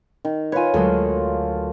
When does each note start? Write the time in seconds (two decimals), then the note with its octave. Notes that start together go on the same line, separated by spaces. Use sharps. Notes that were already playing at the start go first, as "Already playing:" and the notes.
0.25 D#3
0.52 F4 B4 C#5 G#5
0.74 D2 F#3 G#3 A4 A#4